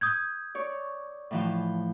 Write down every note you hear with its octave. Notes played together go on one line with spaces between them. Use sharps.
D#6 G6 G#6
C#5 D5
A2 E3 F3